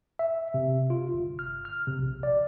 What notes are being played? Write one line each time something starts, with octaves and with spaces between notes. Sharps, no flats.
E5
C3
F4
G1
F6
F6
C3
A#1
D5